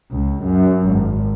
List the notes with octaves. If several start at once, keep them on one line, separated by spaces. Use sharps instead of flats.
C#2
F#2
G#1